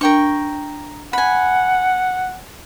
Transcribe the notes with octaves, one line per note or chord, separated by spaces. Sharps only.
D4 A#4 G5 C#6
F#5 G#5 B5